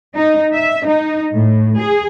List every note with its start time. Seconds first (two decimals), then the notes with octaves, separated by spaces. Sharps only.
0.15 D#4
0.54 E5
0.86 D#4
1.33 A2
1.78 G#4